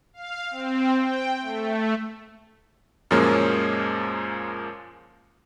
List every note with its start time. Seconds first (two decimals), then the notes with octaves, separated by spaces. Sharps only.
0.14 F5
0.51 C4
0.99 G5
1.40 A3
3.11 F#2 A#2 F3 G#3 A#3 C#4